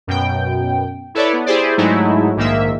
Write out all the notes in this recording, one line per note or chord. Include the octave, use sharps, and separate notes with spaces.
F#2 B2 G5
E4 A4 B4 C#5 D5
B3
E4 G4 G#4 C5 D5
G#2 F#3 G#3 A3 D#4 E4
A#1 G#2 D#3 A#3 E5